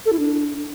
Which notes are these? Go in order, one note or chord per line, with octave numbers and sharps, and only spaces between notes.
A4
E4
D4